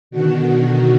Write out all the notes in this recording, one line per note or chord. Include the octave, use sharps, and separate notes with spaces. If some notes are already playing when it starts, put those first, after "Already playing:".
B2 D3 D#3 F#4